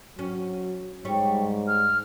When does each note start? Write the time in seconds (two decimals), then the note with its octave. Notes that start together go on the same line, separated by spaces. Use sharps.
0.19 F#3 C#4
1.05 G#2 G3 C#5
1.68 F6